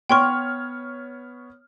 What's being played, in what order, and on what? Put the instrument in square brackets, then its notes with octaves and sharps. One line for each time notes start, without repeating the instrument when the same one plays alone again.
[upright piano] B3 C#5 F6 [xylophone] G5 C6 C#6